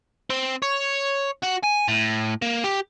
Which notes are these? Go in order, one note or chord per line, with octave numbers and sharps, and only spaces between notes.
C4
C#5
F#4
G#5
A2
A#3
G4